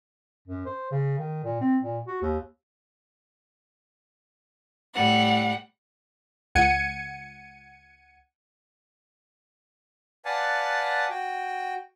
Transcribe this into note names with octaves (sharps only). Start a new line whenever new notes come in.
F#2
C5
C#3
D#3
A#2
C4
A#2
F#4
D#2
A2 G3 F#5
C#2 F#5 G#6 C#7 D#7
B4 D5 F5 F#5 G#5 A5
F#4 G5